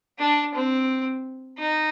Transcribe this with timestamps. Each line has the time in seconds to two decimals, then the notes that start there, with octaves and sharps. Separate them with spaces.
0.19 D4
0.54 C4
1.58 D#4